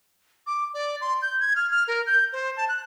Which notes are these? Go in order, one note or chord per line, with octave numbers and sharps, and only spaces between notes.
D6
D5
C6
G6
G#6
F6
F6
A#4
G6
C5
A5
F#6